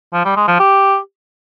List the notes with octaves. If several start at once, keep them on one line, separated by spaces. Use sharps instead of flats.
F3
G3
G#3
F3
G4